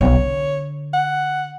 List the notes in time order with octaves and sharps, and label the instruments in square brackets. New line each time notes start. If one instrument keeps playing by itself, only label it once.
[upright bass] B1 F#3 [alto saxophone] C#5
[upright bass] D3
[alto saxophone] F#5